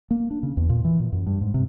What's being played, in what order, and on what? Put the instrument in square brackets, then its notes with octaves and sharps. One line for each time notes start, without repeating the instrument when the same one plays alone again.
[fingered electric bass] A#3
D4
C#3
E2
A#2
E3
A#2
F#2
G2
G#2
C3